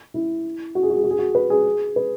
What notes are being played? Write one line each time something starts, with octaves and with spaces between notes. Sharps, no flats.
E4
F#4
G#4
F#4
G#4
F#4
G#4
F#4
B4
G#4
B4